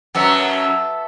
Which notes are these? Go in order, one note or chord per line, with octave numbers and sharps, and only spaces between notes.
F#2 F#3 B3 F#4 A4 E5